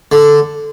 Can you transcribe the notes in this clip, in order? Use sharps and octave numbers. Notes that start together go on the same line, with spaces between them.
D3